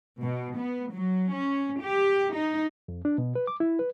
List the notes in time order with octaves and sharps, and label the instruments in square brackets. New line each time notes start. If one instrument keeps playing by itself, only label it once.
[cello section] B2
B3
F#3
C#4
G4
D#4
[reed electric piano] F2
D4
B2
B4
D6
E4
B4